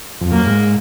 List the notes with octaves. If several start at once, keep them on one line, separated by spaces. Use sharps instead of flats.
F2
F#2 A#3
G#2